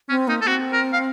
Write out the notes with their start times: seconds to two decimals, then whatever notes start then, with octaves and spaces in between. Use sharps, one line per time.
0.09 C4 C#4
0.27 A#3 D#4
0.41 A#3 A4
0.47 C4 F#4
0.73 A#4
0.93 F5